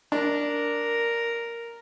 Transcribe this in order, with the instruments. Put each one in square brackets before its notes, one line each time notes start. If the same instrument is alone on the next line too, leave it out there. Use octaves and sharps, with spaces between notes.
[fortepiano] D4 [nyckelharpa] A#4